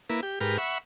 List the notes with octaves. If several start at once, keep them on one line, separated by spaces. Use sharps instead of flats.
A#3 E4 B4
G4
G#2 G4 A#4 B4 F6
E5 F#5 B5 C#6